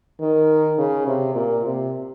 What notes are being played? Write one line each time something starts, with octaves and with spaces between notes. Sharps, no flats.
D#3
C#3
C3
A#2
C3